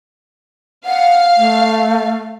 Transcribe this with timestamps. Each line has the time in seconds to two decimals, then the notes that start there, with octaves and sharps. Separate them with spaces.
0.86 F5 F#5
1.37 A3